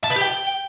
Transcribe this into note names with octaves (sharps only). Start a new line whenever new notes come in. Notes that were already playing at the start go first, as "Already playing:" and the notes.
A5
B4
G4
G5